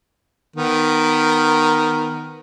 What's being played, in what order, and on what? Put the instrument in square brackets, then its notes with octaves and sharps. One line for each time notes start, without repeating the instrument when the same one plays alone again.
[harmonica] D#3 B3 A#4